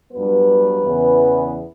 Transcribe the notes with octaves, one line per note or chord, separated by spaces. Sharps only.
G2 F#3 B3 B4
E2 C#3 E3 B3